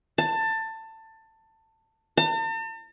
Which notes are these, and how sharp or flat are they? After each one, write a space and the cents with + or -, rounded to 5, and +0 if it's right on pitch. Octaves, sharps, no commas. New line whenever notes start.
A5 +20
A5 +45